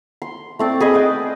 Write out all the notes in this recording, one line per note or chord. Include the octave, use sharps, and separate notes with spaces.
C6
A3 C4 D5
G#4 B4 D#5
B4 D5 G5